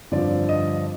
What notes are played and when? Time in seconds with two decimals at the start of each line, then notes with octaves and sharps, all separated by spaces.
0.12 G2 D3 F3 C4 D5
0.49 D#5